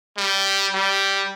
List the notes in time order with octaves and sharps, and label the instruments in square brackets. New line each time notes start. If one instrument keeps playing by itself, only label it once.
[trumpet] G3
G3